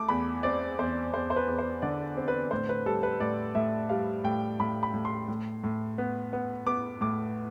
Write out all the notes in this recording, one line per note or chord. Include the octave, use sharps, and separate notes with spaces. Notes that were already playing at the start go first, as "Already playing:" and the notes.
Already playing: A3 D6
E2 B5
C4 D5
E2 C5
E2 C5
C5
B4
E2
C5
D3 D5
C4
B4
A2 C5
B4
G3 A4
B4
A2 D5
A2 E5
G3 F5
A2 G5
A2 B5
B5
A2
C6
A2
A2
B3
B3
B3 D6
A2 D6